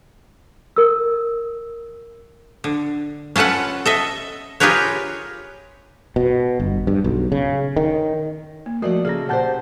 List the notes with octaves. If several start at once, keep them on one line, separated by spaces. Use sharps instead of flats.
A#4 E6
D3
C#4 F4 A4 B4 F#5
A4 D#5 E5
F4 G4 G#4 A#4 B4 C#5
B2
G1
G2
B1
C#3
D#3
A#3
F3 A3 A#3 F#4 D5 D#5 F#5
C#3 C#4 G#4 A4
A#2 G4 C5 F#5 A5 G6